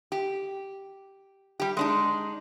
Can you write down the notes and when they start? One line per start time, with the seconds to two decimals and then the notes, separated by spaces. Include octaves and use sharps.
0.12 G4
1.60 G3 G4
1.77 G#3 D4 D#4